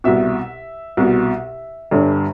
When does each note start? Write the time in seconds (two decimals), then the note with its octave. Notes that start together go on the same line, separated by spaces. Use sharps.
0.04 C2 B2 E5
0.97 C2 B2
1.91 G1 G2 D3